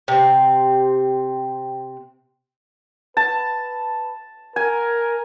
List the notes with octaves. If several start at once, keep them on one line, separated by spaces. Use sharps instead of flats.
C3 C4
B4 A5
A#4 G#5